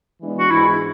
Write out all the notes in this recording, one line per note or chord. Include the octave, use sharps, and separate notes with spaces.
E3 G#3 B3 D4
F#4
G#2 E3 G#3 D4 E4 G#4